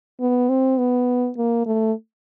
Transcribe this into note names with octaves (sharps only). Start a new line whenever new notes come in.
B3
C4
B3
A#3
A3